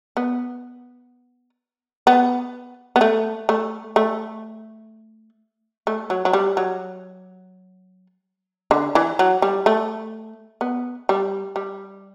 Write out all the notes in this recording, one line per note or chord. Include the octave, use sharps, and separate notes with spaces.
B3
B3
B3
A3
A3
A3
A3
F#3
F#3
G3
F#3
D3
E3
F#3
G3
A3
B3
G3
G3